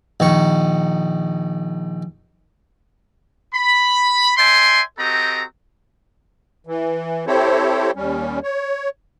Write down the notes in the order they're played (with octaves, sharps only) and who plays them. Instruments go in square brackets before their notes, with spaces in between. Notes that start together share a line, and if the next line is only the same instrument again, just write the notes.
[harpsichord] A#1 D#3 C#6
[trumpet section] B5
D5 E5 G5 G#5 C6
C4 F#4 G4 A4 D#5 A#5
[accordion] E3
C4 E4 G4 A4 C5 C#5
D#2 G3 C#4
C#5